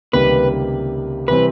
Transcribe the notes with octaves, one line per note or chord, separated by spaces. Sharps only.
C#2 C3 D#3 G3 A#3 B4
C3 E3 G3 C4 B4